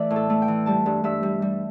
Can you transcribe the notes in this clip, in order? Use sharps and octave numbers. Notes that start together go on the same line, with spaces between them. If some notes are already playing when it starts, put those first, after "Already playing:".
Already playing: E3 A3 B4 D5 E5
A2
A4
A3
G5
E3
G3 A5
G2
G2 E5
G3
G3